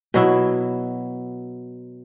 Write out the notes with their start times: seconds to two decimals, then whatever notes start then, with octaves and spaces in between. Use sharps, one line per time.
0.14 B2 F#3 E4